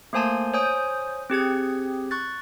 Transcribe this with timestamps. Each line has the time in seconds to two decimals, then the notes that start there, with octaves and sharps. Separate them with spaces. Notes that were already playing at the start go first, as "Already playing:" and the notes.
0.13 A3 A#3 C5 G#5 A5 C6
0.53 C5 C#5 G#5 D#6 G6
1.30 C4 G4 G#4 G#6
2.11 C#6 F#6 A6